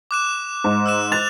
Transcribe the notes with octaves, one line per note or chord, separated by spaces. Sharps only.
D6 F#6 E7
G#2
E6 F#6 E7
F#6 A6 F7